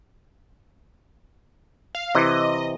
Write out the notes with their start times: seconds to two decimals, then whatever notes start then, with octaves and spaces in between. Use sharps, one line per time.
1.95 F5
2.15 C3 E3 D#5